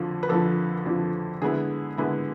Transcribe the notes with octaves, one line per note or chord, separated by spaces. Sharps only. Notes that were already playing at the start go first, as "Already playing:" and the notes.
Already playing: F2 D3 F3
B4
F2 D3 F3 A4
F2 D3 F3
D3 G#3 B3 E4 G#4
D3 G#3 B3 E4